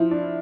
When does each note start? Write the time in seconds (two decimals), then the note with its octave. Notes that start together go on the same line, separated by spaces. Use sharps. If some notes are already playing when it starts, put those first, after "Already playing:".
Already playing: F3 E4
0.11 D4